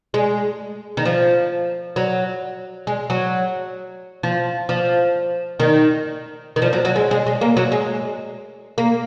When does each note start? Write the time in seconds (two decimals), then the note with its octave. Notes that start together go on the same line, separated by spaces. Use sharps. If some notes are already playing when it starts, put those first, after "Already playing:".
0.14 G#3
0.97 D#3
1.05 F3
1.96 F#3
2.87 G#3
3.10 F#3
4.23 F3
4.69 F3
5.60 D#3
6.56 D#3
6.62 F3
6.73 F#3
6.85 F#3
6.96 G#3
7.11 G#3
7.27 G#3
7.41 A#3
7.57 F#3
7.72 G#3
8.78 A#3